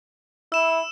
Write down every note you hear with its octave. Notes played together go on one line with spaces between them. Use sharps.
E4 E6 E7